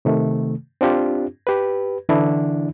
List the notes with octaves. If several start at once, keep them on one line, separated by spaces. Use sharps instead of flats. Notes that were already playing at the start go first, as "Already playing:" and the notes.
C3 D#3 A3
C4 D4 F4 G4
G4 B4
D3 E3 D4 E4